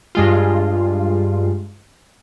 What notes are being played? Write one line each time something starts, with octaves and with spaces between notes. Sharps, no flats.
G2 G#3 F4